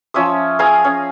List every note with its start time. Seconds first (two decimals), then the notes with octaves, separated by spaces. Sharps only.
0.14 F3 C#4 E5 D#6
0.59 G#4 F5 G#5 A#5
0.84 C#4